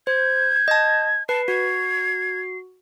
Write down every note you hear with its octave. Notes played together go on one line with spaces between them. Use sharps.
C5 G6 G#6
D#5 A5
B4 A5 C7
F#4 G#6